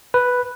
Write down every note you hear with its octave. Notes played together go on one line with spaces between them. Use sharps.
B4